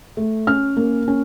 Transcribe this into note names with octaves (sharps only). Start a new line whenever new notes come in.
A3
C#4 F6
A#3
C#4